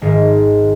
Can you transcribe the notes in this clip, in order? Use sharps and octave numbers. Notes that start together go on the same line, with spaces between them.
G#1 G#2 D#3